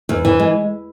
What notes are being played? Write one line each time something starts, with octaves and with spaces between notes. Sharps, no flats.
E2
E3
G#3